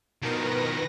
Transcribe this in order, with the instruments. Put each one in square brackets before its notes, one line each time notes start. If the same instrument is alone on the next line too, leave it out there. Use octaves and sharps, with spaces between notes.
[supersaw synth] B2 A#4 [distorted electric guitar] D#3 F3 [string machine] B4 A#6